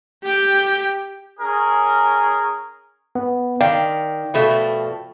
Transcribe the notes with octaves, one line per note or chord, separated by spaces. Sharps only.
G4 G5
C#4 G#4 A#4
B3
D#3 D5 F5 G5
B2 F3 A3